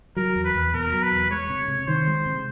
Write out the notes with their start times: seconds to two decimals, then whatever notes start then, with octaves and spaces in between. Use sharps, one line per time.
0.16 F#3 A#4
0.36 E2
0.45 B4
0.55 E2
0.74 B2 A#4
0.93 F#3
1.03 B4
1.11 E2
1.31 G#3 C#5
1.50 C3
1.68 C3
1.88 D#3 C5
2.07 G#3
2.26 C3